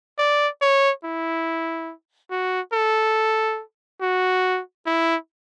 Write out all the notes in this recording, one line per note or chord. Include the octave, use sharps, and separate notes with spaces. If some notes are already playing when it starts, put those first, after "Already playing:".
D5
C#5
E4
F#4
A4
F#4
E4